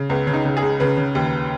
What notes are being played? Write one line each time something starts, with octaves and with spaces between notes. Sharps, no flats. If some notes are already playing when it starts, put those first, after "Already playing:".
Already playing: C#3
C#2 B3
C#3
D#4
C#3
G#4
C#2
C#3 B4
C#3
D#2